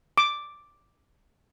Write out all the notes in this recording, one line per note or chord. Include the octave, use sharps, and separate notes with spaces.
D6